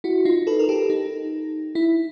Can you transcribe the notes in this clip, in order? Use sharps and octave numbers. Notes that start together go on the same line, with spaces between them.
E4 F#4
D#4 F4
A4 B4
A#4
G4 A4
D#4
E4